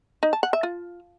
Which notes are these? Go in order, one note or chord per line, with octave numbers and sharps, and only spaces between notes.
D#4
A5
F#5
E5
F4